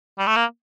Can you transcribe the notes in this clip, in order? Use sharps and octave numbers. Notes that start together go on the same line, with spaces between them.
G3
A3
A#3